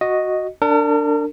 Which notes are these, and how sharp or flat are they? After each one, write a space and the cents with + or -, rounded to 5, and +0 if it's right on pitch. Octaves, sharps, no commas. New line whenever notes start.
F#4 -5 D#5 +0
D4 +0 A#4 -40